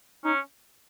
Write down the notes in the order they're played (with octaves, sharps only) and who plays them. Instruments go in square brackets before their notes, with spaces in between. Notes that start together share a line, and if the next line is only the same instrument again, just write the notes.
[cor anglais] C#4 [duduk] D#4